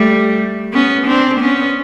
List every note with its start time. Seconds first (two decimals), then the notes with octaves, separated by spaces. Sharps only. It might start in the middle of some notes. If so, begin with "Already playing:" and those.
Already playing: G3 A3
0.73 B3 C#4
1.07 C4 D4
1.40 B3 C#4